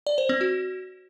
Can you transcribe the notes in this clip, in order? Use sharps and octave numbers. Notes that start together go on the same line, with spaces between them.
D5
C5
C4
F#4